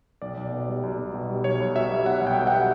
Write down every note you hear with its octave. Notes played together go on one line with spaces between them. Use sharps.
B1 D5
B1
B2
G3
B1
B1
B2
G3
B1 C#5
B1
B2 E5
G3
B1 F#5
B1
G5
B2
F#5
G3